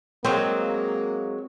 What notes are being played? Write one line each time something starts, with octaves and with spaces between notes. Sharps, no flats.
F#3 G#3 A#3 C4